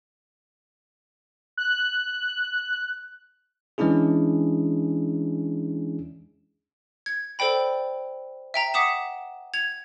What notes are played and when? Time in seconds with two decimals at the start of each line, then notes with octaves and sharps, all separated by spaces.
1.57 F#6
3.78 E3 G#3 C#4 D4 E4 G#4
7.06 G#6
7.39 A4 C5 D5 G5 B5
8.54 E5 G5 A#5
8.74 F#5 D6 D#6 B6 E7
9.54 G#6 F7